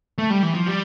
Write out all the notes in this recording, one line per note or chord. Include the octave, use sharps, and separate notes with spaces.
A3
G3
E3
F3
G3